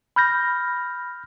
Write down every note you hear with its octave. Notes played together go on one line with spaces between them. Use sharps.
B5 F6 G6 A#6